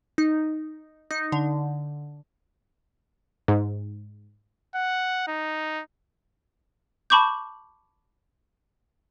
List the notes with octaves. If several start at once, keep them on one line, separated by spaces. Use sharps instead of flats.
D#4
D#4
D3
G#2
F#5
D#4
A5 B5 C#6 D6 G6